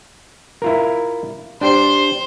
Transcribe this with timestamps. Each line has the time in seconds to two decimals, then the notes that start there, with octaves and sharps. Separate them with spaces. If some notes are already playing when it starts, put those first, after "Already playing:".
0.62 E4 F4 A#4
1.61 D4 G4 C5